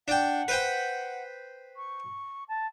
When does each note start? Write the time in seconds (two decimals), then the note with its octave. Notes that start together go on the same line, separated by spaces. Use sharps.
0.08 D4 F#5 G5
0.48 B4 C5 G5
1.76 C#6
2.48 A5